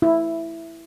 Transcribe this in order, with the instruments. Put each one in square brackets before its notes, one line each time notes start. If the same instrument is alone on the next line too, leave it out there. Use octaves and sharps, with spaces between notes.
[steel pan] E4